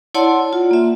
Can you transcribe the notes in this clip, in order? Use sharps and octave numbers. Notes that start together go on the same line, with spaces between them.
E4 C#5 D5 F#5 A5 C6
F4
A#3 E5